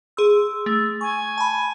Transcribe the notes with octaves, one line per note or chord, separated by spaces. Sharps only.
G#4 C6 E6
A3
G#5 C#6
A5 B5